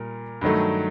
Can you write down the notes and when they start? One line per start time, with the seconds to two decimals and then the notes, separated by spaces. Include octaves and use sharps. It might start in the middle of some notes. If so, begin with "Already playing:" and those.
Already playing: A#2 G3 A#4
0.41 G2 D#3 F#3 A3